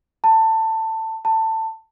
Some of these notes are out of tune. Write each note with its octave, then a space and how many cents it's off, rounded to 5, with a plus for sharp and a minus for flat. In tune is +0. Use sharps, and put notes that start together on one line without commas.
A5 +20
A5 +20